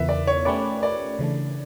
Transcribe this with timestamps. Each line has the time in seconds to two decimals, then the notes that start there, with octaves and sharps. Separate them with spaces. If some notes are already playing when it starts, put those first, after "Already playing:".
Already playing: E2 C#3 E3 B3 E4 B4 E5
0.09 D5
0.27 C#5
0.45 A3 C#4 G4 B4 C#5 D5
0.83 D5
1.19 C#3 E3 A3 D4